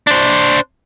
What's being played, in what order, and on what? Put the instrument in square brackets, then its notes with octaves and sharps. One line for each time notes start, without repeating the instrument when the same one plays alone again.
[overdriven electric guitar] D4 C5